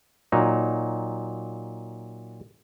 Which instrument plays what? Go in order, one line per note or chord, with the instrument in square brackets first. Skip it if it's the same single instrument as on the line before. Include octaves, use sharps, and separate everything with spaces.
[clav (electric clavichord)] A#2 F#3 D#4